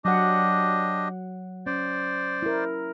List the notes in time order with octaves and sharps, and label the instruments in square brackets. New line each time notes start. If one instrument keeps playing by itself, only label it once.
[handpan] F#3 F#5 [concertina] D4 G4 D#5
[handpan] C#4 [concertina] C5 D5
[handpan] E4 A#4